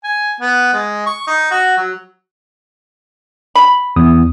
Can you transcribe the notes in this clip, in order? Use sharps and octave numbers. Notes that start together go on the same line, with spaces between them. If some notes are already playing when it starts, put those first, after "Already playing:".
G#5
B3
G#3
C#6
D#4
F#4
F#3
B5
E2 D#6